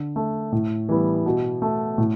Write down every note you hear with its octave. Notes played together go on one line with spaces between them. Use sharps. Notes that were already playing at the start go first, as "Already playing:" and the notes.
Already playing: D3
A3
A2
E3 G3 B3
B2
A3
A2